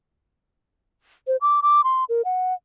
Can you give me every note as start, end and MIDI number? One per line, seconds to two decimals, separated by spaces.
1.27 1.37 72
1.41 1.60 86
1.62 1.84 86
1.84 2.04 84
2.09 2.22 70
2.25 2.54 78